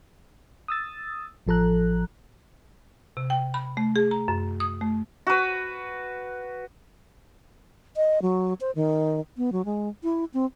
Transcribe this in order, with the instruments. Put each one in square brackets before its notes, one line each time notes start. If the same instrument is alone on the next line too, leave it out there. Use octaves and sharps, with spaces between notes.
[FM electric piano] D#6 E6 A6
A1 F3 A4 A#5 F#6
[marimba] C3
G5
B5
A3
G#4
A#5
F#2
D#6
A3
[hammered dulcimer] F#4 B4
[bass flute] D#5
F#3
C5
D#3
B3
F#3
G#3
E4
C4